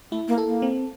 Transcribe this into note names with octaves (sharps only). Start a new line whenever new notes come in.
A3 E4
A#3
A4
A#3
C4